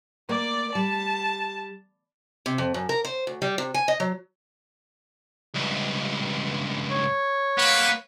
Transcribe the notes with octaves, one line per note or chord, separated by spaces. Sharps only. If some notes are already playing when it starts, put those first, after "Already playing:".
A#3 D5 D6
G3 A5
C3
F2
F#2
A#4
C5
D2
G3
C3
G#5
D#5
F#3
C#2 G2
C#5
A#3 B3 B4